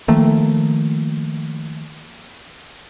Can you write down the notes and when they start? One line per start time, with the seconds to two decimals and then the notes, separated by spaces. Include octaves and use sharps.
0.08 D#3 F3 A3 A#3